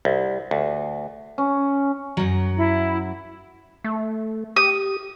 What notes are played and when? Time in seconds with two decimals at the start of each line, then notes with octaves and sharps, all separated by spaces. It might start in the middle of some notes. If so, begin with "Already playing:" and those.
0.05 C2
0.51 D2
1.38 C#4
2.17 F#2 F#3
2.57 E4
3.84 A3
4.56 G4 D#6